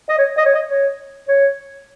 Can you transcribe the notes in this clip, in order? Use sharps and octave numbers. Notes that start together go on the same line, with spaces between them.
D#5
C#5
D#5
C#5
D#5
C#5
C#5